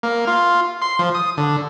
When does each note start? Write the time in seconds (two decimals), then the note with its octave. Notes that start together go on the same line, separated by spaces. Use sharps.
0.03 A#3
0.27 F4
0.82 C6
0.99 F3
1.15 D#6
1.37 D3